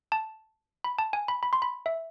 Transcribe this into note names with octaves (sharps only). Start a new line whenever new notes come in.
A5
B5
A5
G#5
B5
B5
C6
B5
E5